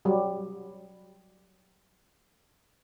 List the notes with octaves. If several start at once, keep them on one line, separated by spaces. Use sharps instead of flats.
F#3 G3